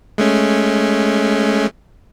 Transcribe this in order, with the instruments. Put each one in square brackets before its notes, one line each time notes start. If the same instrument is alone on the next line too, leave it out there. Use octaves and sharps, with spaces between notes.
[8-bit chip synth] G#3 A3 C#4